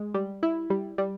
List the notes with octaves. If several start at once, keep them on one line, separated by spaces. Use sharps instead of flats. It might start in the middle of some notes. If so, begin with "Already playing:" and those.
Already playing: G#3
G3
E4
G3
G3